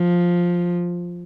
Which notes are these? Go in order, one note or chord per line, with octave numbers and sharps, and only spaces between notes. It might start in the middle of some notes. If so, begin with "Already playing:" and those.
Already playing: F3